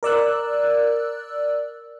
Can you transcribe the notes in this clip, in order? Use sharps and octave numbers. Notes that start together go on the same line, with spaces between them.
A#4 D5 E6 F#6